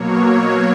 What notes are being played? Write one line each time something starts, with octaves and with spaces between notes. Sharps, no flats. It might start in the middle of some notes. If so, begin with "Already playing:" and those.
Already playing: B2 F#3 A#3 C#5
C#5